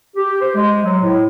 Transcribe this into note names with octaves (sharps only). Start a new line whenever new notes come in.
G4
C5
G#3
F#3
A2